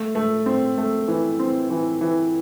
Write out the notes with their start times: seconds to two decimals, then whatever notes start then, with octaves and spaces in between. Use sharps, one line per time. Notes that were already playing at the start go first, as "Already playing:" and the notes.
Already playing: A3
0.15 A3
0.46 C4
0.78 A3
1.08 E3
1.39 C4
1.70 E3
2.01 E3